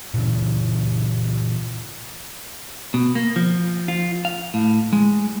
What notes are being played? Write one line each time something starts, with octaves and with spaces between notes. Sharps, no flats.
A#2 C#3 E3
B2
A#3
F3
F4
F5
A2
G#3